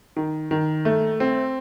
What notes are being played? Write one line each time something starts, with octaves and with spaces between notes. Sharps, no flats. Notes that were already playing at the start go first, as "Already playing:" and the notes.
D#3
D#3
A3
C4